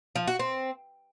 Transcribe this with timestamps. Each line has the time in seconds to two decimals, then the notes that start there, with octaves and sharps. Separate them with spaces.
0.16 F3
0.28 F#4
0.39 C4